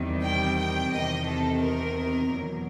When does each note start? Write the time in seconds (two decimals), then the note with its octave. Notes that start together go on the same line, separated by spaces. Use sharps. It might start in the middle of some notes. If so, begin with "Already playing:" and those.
Already playing: E2 C3 D#3 G3
0.21 G5
0.56 G5
0.90 E2 C3 D#3 D#5
1.26 A4
1.60 A#4
2.29 E2 B2 F#3